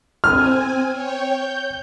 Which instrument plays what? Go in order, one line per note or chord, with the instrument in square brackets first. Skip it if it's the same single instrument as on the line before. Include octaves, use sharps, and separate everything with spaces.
[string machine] C4 G#5 [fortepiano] F6
[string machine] C#5 G5
G6